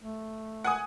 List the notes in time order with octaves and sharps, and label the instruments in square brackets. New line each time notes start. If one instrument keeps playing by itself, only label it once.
[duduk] A3
[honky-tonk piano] F#5 G#5 D#6